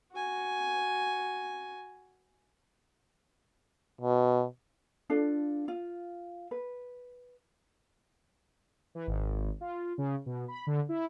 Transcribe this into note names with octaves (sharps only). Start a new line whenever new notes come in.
F#4 G#5
B2
D4 F4 A4
F4
B4
E3
G#1
F4
C#3
B2
B5
D3
E4